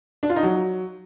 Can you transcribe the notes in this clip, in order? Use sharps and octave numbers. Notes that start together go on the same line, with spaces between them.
D4
F4
D#4
F#3